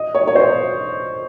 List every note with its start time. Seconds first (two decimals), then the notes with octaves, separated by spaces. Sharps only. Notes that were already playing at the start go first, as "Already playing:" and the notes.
Already playing: D#5
0.15 C#5
0.28 C#5
0.35 C5